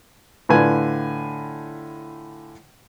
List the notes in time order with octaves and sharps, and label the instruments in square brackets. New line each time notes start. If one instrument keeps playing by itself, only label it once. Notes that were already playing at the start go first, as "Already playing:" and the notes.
[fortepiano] A2 D3 F4 B4 G#5